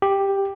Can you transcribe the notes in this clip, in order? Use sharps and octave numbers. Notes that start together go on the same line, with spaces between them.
G4